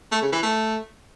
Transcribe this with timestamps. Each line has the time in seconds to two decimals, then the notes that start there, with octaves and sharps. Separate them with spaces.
0.12 A3
0.22 C#3
0.32 E3
0.42 A3